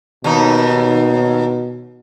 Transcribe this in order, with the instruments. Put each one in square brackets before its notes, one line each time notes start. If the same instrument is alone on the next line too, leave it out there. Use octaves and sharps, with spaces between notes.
[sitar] D#2 D#4 [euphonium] B2